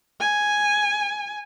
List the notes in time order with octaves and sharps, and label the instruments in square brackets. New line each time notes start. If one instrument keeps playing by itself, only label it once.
[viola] G#5